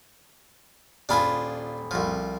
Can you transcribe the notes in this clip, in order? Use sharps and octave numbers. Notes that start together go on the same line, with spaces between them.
D#1 D4 F4 G#4 B5
C2 F3